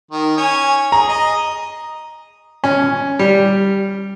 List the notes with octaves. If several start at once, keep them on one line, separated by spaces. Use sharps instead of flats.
D#3
C#4 G#5
G#4 A#5
D#5
C#4
G3